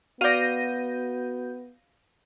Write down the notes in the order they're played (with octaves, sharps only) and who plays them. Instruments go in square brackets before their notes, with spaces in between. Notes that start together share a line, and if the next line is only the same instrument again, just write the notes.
[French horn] B3 [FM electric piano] F#4 G6 [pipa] D5 F5 [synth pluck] A#6 D#7